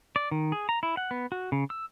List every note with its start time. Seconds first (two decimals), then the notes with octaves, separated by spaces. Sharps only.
0.16 D5
0.31 D#3
0.52 G#4
0.69 A#5
0.83 E4
0.97 F#5
1.11 B3
1.32 F#4
1.52 C#3
1.70 E6